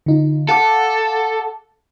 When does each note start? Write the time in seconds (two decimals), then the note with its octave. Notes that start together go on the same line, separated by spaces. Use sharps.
0.06 D3 D#4 F4
0.49 A4 F5 F#5 D6